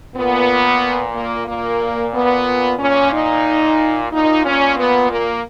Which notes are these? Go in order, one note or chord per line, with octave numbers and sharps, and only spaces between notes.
A#2 B3
A#3
A#2 A#3
B3
A#2 C#4
D#4
A#2 D#4
C#4
B3
A#3